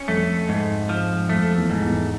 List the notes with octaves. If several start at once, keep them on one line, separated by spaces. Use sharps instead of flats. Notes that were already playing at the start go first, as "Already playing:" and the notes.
Already playing: C#4
F2 A3
G#2
F3
F2 A3
E2
G#2
E2